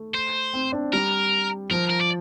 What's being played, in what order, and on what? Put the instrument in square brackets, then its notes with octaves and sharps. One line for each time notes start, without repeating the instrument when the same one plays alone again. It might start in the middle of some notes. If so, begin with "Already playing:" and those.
Already playing: [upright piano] A3
[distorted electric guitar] C5
[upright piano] C4
D4
[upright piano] G3 [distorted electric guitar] A#4
[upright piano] F3 [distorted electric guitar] A#4
[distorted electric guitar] A#4
D5